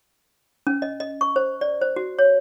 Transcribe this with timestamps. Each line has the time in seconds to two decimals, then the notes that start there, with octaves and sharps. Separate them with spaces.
0.67 C#4
0.82 D#5
1.00 D#5
1.21 C#6
1.36 C5
1.61 D5
1.81 C5
1.96 F#4
2.19 C#5